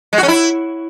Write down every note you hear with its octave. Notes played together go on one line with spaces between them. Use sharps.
G#3
F#4
C#4
E4